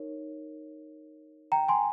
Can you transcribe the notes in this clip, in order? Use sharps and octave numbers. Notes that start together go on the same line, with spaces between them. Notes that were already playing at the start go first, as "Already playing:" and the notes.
Already playing: D#4 A#4 C#5
G5 A#5
G#5 C6